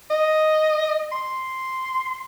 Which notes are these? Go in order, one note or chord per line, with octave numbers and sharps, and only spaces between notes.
D#5
C6